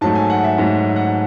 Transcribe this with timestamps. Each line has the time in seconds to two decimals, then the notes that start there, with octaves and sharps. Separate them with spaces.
0.01 G#2 F#3 A3 A5
0.15 G#5
0.30 F#5
0.44 E5
0.58 G#2 F#3 A3
0.96 F#5